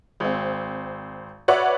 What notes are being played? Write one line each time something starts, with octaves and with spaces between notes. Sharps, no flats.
G#1 C4
F#4 B4 C#5 D5 E5 F#5